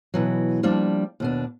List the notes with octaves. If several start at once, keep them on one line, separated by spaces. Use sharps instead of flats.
B2 E3 F#3
F3 G3 A#3 D4
D#2 B2 D4